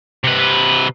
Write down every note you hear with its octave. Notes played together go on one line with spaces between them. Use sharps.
C3 B4